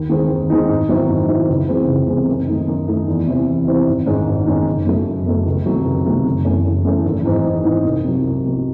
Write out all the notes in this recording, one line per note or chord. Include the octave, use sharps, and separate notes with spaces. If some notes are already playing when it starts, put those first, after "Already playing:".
Already playing: D#2
D#3 G#3 C4 D#4
D#2
D#3 G#3 C4 D#4
G#2
D#3 F#3 C4 E4
G#2
D#3 F#3 C4 E4
C#2
C3 E3 G#3 C4
C#2
C3 E3 G#3 C4
F#2
D#3 A3 D#4
F#2
D#3 A3 D#4
E2
C3 E3 C4 E4
E2
C3 E3 C4 E4
G#1
G#2 D#3 G#3 C#4
G#1
G#2 D#3 G#3 C#4
F#1
F#2 C#3 F#3 A3
F#1
F#2 C#3 F#3 A3
C#2
C3 D#3 F#3 A3
C#2
C3 D#3 F#3 A3
F#1
F#2 E3 A3 C#4
F#1
F#2 E3 A3 C#4
G#1
G#2 E3 C4 D#4
G#1
G#2 E3 C4 D#4
C2
C3 F#3
C2
C3 F#3